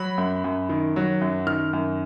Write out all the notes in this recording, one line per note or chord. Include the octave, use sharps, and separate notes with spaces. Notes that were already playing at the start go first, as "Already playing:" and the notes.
Already playing: F#3 B5
F#2
F#2
D#3
F#3
F#2
D#3 F6
F#2